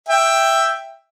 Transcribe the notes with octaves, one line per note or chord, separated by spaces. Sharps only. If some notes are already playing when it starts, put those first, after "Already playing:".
E5 G5